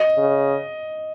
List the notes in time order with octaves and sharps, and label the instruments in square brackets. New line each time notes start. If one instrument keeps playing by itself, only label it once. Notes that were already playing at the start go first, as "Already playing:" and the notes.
Already playing: [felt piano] D#5
[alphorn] C#3